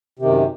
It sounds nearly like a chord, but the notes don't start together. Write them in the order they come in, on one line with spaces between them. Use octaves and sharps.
C3 D#3 F#2